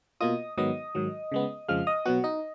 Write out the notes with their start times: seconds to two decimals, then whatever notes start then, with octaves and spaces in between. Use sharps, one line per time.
0.21 B2 A#3 F4 D#5 D#6
0.58 G#2 D#3 F#3 B3 D#5 D#6
0.95 G#2 D#3 F#3
1.32 C#3 G#3 B3
1.68 F2 C#3 F3 G#3 F5 F6
1.87 D#5 D#6
2.05 B2 F#3 B3 F#4 F#5
2.24 D#4 D#5